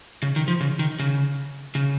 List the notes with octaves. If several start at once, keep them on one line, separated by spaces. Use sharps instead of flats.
C#3
D#3
F3
C#3
D#3
C#3
C#3